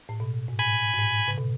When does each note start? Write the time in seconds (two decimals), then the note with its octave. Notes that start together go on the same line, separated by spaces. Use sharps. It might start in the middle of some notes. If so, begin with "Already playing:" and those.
0.09 A2
0.20 B2
0.48 G#2
0.58 A2 G#5 B5
0.93 G#2
0.99 A2
1.28 C#3
1.38 B2